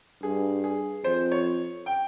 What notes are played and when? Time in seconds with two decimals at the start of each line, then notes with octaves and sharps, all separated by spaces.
0.23 G2 G#4
0.64 G#4
1.04 F2 C5
1.32 C#5
1.86 G5